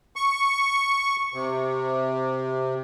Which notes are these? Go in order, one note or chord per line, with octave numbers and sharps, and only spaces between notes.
C#6
C3